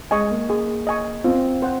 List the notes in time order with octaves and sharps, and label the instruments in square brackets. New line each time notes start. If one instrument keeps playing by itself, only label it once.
[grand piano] G#3 [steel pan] D#5 G#5 C#6
[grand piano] A#3
[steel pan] G#4
D#5 G#5 C#6
[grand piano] C4 [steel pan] F4
[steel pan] C5 F#5